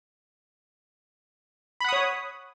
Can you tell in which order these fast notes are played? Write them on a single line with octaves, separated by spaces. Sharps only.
B5 F#5 D#6 C#5